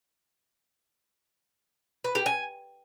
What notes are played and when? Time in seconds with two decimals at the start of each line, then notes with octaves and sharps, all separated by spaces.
2.04 B4
2.15 G4
2.26 G#5